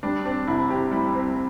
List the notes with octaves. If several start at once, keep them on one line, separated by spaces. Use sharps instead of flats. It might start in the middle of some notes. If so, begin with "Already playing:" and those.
G3 D4
C4 D4
C2 E4
C3 G4
G3 E4
C4